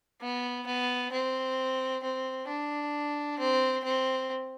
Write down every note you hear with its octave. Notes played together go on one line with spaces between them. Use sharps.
B3
B3
C4
C4
D4
C4
C4